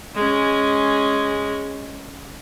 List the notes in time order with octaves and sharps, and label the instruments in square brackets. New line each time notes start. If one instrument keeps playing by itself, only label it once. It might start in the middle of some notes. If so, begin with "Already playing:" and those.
[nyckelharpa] G#3 C#4